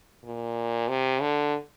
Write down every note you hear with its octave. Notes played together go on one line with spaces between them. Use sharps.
A#2
C3
D3